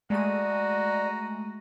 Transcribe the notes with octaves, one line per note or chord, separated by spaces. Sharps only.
G#3 A3 F#4 D5 A#5 D#7